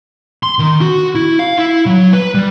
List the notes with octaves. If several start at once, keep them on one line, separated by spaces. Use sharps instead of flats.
C6
D#3
F#4
E4
F5
E4
F#3
B4
G3